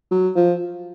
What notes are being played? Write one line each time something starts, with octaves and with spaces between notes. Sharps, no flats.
F#3
F3